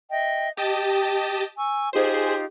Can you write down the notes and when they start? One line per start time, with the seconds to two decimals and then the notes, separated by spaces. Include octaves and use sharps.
0.10 D#5 E5 G5
0.57 G4 D#5 G5 A5
1.56 G#5 C#6 E6
1.93 D#4 F4 G4 G#4 C5